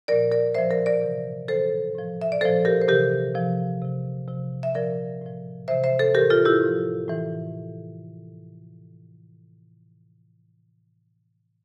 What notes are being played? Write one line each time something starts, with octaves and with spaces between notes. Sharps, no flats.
A#2 F3 A#4 D5
A#4 D5
A2 F3 C5 E5
A#4 D5
A#4 D5
C3 E3
A2 E3 A4 C5
A2 F3
E5
D5
A#2 F3 A4 C5
G4 A#4
C5
C3 E3 G4 A#4
C3 F3
C3 F3
C3 F3
E5
A#2 F3 A#4 D5
A2 F3
C3 E3 C5 E5
C5 E5
A4 C5
A2 E3 G4 A#4
F4 A4
E4 G4
A2 F3
A2 E3